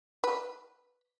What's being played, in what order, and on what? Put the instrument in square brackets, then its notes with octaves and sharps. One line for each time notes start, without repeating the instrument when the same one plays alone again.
[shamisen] B4